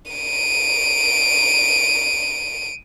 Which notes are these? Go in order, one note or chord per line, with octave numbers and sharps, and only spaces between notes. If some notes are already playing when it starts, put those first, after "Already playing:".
D7 D#7